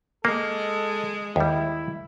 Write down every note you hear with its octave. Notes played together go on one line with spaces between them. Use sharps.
G#3 A#3 A4
D#2 G3 E4